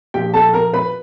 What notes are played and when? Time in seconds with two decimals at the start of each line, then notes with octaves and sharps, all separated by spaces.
0.14 A#1 A#2 F3 G4 G5
0.34 A4 A5
0.54 A#4 A#5
0.73 B4 B5